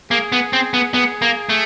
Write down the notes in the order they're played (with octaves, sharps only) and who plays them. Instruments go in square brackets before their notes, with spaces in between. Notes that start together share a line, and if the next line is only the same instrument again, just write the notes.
[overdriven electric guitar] A#3 [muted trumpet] G#4
[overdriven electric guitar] B3
C4
B3
B3
A#3
A3